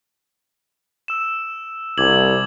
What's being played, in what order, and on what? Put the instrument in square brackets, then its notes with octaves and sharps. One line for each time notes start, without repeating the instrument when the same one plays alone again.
[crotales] E6 E7
[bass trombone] C2 [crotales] D6 G#6 F#7